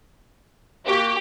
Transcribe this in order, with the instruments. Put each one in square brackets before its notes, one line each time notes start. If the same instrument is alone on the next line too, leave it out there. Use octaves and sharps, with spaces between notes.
[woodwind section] A#3 F#4 [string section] G4